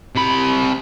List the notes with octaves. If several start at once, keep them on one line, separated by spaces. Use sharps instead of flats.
C3 B5